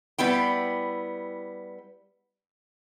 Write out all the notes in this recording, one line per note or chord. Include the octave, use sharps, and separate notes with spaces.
G3 B3 E4 G5